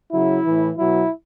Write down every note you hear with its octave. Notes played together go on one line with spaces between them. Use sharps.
C#3 F#3 E4
A2 E3
B2 F#3 E4